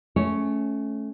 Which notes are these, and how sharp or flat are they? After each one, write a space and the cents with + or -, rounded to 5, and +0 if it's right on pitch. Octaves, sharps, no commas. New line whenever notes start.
A3 -20 C#4 +0 C#5 +0